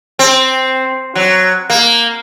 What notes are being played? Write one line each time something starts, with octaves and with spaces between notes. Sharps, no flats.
C4
F#3
A#3